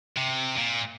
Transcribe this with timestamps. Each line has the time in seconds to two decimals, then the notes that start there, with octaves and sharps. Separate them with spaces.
0.17 C3
0.58 A#2